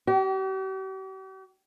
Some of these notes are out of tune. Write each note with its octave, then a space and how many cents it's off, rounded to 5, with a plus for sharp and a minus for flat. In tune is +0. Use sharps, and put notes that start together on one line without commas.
G4 -45